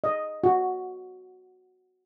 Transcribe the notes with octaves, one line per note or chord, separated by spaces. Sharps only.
D#5
F#4